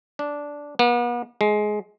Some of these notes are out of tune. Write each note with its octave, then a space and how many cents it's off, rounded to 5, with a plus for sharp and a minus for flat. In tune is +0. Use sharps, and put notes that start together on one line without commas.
D4 -10
B3 -40
G#3 +15